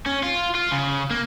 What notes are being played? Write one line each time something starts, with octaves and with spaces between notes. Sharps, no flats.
C#4
F4
F4
C#3
A#3